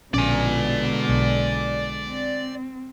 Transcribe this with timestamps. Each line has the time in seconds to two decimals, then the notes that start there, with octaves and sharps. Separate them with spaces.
0.14 A#1 B2 D3 G#3 C#4 D5 G#5
1.09 B1
2.05 C4